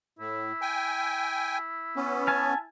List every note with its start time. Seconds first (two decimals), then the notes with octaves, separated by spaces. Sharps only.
0.19 A2 E4
0.61 G5 G#5
1.96 B3 C#4
2.27 G#5 A5 F6